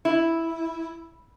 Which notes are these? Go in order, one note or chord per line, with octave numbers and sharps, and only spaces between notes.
E4